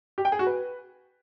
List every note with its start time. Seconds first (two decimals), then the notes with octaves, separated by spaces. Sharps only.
0.18 G4
0.25 G5
0.32 G#4
0.39 F#4
0.46 B4